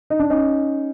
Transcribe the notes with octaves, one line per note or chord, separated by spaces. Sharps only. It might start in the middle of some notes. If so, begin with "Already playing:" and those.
D#4
D4
C#4 D#4